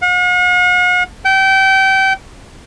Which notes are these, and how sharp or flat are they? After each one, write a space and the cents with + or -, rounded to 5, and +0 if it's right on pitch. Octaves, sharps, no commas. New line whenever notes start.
F#5 -45
G5 -30